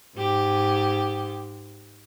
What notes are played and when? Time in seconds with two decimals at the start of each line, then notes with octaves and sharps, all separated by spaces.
0.15 G#2 G4